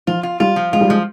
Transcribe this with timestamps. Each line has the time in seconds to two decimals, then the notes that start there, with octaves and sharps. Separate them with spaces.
0.07 F3 F4
0.23 F4
0.40 G3 F4
0.56 F3
0.73 G#3 F4
0.81 G3
0.89 F3 G#3